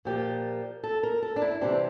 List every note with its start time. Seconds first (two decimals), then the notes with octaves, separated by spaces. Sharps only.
0.05 A#2 F3 A#3 G4
0.84 A4
1.03 A#4
1.22 A4
1.36 D4
1.42 E4
1.61 C3 E3 G3 C4 D4